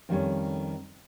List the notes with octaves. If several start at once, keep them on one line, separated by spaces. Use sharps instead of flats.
F2 D#3 G3 A3 C#4